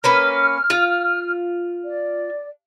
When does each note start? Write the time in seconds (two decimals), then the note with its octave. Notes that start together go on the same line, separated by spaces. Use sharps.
0.04 A#3 C#4 B4 F6
0.70 F4
1.86 D5